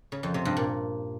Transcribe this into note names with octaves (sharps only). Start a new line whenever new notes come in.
C#3
F2
C3
G2
A#2